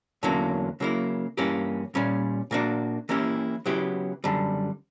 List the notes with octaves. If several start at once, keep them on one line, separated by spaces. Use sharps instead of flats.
E2 D3 F#3 A#3 C#4
C#3 F#3 A#3 E4
G2 E3 A#3 C#4 G4
A#2 G3 C#4
A#2 A#3 D4 F#4
E3 A#3 C#4 E4 G4
C#3 F#3 B3 E4 G4
F#2 D3 G3